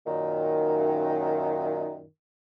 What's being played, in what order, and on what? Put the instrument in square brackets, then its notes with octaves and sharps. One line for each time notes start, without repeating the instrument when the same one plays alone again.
[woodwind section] F#2 A#2 D#3